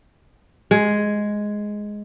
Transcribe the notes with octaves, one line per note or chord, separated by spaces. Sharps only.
G#3